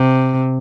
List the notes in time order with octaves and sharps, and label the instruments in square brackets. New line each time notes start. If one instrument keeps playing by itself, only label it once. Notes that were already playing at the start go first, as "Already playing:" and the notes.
Already playing: [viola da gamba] C3